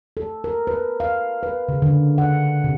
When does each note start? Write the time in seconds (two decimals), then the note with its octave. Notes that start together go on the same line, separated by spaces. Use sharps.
0.17 A4
0.44 A#4
0.67 B4
1.00 F5
1.43 B4
1.69 C#3
1.82 D3
2.18 F#5
2.64 C3